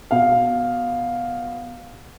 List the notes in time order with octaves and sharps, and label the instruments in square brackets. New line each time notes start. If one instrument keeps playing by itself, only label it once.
[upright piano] B2 F5